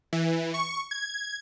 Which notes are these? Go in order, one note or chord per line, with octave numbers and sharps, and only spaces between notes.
E3
C#6
G#6